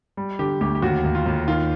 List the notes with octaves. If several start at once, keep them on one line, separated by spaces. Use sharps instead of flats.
G3
D3 G4
D2 G4
G4
D#2 F#4
D#2
F4
D#2
D#3 F4